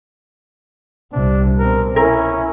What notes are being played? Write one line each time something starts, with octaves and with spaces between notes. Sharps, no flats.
C2 C3 D4
B2 C4 A#4
C#4 E4 A#4